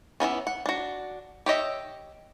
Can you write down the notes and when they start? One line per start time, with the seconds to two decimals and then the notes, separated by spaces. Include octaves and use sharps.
0.20 E3 A#3 B3 C#4
0.47 F#5
0.66 D4 F#4
1.46 G4 C#5 D#5 E5